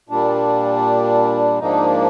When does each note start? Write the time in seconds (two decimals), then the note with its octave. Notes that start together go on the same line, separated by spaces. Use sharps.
0.09 A#2 G3 D4
1.59 G#2 F3 A#3 D4 D#4